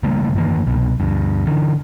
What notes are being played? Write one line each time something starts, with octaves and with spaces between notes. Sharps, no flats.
C#3 G3 A3 A#3
G2 D#3 E3 A#3
C2 B2
D2 G2
D3 E3